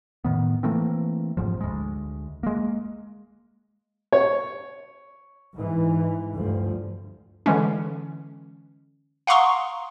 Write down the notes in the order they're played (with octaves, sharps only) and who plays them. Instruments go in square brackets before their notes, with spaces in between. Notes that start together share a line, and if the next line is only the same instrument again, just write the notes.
[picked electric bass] A2 D#3 B3
E3 A3 A#3 C4
G1 G#2 F3
D2 G#3
G#3 A#3
[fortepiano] C#5
[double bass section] G#2 E3
D2 G2 F3
[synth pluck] D3 E3 G#3 C#4
F5 F#5 A#5 C6 C#6 D#6